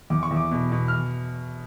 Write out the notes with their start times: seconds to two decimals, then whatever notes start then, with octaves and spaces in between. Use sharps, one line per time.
0.10 E2 D6
0.23 C#6
0.31 E2
0.36 D6
0.51 B2
0.72 B2
0.88 F6